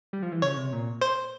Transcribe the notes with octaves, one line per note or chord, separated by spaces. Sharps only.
G3
F3
E3
C#3 C#5
C3
A#2
C5